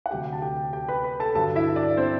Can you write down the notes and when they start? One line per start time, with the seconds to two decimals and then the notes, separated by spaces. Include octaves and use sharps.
0.06 F#5
0.11 D2 C3 F#3 G4 G5
0.33 A5
0.42 G4 G5
0.73 G4 G5
0.89 B4 B5
1.04 B4 B5
1.20 A4 A5
1.35 G2 D3 F#3 A4 A5
1.56 E4 E5
1.76 D4 D5
1.97 C4 C5